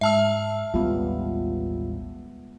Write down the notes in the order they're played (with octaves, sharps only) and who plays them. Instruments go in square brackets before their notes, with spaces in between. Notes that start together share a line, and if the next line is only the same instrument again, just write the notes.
[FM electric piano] G#2 F6 [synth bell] E5 A5 E6
[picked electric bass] A1 D#2 G3 [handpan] G#3 B3 [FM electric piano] F4